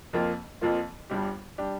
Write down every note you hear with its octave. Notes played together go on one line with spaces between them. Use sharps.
F2 F3 A#3 F4
F2 F3 A#3 F4
G1 G2 G3 D4 G4
G3 D4 G4